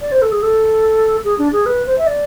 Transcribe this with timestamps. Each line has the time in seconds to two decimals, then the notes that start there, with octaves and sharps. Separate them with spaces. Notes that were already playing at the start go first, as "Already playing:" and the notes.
0.01 D5
0.12 C5
0.22 A4
0.32 G#4
0.43 A4
1.25 G#4
1.39 D4
1.52 G#4
1.66 B4
1.86 C5
1.98 E5
2.07 D5